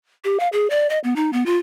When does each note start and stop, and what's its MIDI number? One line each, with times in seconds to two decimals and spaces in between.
0.24 0.38 67
0.40 0.48 77
0.53 0.69 68
0.70 0.87 74
0.90 0.99 75
1.04 1.16 59
1.16 1.31 63
1.33 1.46 59
1.46 1.57 65